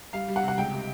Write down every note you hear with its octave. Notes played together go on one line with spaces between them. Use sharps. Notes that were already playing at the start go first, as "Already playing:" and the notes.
G3 F5
G3
F#5
C3
F#5
C#2 G5
C3